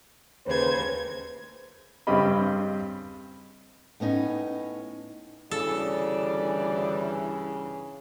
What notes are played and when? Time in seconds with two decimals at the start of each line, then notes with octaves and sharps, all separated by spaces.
0.46 D#2 C#3 B4 C5 G#6
2.07 G2 C#3 C4 G4 D#5 B5
4.00 A2 B3 C#4 D#4
5.51 D2 G2 C#3 E3 A4 D5